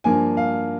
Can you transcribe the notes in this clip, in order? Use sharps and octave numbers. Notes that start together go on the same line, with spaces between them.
G2 F3 A#3 G#5
F5